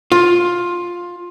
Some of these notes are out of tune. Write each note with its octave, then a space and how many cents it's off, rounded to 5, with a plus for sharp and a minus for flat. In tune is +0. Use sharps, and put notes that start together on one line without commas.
F4 +10